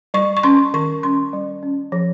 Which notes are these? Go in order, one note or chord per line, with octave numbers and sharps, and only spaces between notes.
G3 C#6
C#6
C#4 C6
D#3 C#6
G3 C#4 C6
G3
C#4
F3